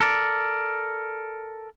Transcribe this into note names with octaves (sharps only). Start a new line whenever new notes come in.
A4 A#4 D5